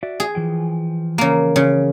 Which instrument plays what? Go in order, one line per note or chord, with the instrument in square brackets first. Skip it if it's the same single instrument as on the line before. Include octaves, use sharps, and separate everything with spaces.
[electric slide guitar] F#4 D5 E5
[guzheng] G#4
[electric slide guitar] E3 F3 G5
[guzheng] C#3 A#3
C#3